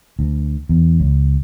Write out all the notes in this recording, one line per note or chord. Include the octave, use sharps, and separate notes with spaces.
D2
E2
C#2